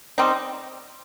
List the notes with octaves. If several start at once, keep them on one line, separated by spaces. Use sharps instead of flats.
G3 C4 D#4